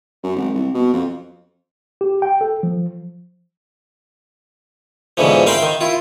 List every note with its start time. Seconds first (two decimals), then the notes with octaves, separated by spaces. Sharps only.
0.23 F#2
0.36 G#1
0.54 C2
0.74 B2
0.93 F2
2.01 G4
2.22 G5
2.41 A4
2.63 F3
5.17 G#2 B2 D3 E3 F3
5.47 A#4 E5 F5 G5 B5 C6
5.62 D#3
5.81 E4 F4